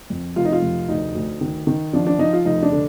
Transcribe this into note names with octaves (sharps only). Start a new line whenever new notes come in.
F2
F1 F4
D#4
F4
F1
D2 D#4
D2
D#3
D#3
F3 D4
D4
F3 D#4
F4
F1 D#4
D4
D3